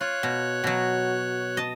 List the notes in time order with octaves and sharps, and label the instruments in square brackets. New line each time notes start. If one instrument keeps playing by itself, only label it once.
[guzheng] F4 [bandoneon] C#5 F#6
[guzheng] B2
B2 F#3
D#5 A5